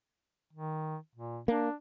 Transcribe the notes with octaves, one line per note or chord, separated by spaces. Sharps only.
D#3
A#2
A#3 D4